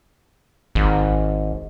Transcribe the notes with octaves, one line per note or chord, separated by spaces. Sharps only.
G#1